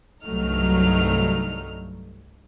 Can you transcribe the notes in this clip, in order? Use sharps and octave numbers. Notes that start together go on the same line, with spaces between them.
C2 G2 F#3 A3 D#4 F6